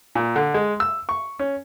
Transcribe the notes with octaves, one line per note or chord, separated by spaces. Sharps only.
A#2
D3
G#3
E6
C#6
C#4